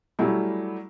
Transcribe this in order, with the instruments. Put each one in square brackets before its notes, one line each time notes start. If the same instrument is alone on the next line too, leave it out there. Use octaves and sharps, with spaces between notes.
[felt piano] F#3 G3 A3 C#4 E4 G4